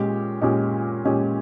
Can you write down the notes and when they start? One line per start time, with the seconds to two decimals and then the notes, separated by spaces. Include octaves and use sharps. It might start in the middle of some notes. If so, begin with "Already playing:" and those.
Already playing: A#2 G#3 C#4 G4
0.41 A#2 G#3 C#4 G4
1.05 A#2 G#3 C#4 G4